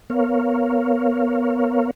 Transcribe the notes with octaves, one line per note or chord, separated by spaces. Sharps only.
B3 A#4 C#5 F5